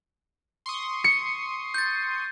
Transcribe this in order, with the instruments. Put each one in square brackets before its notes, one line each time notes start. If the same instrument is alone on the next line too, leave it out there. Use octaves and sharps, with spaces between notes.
[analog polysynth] C6 C#6 D#6
[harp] C#7
[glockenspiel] G6 A6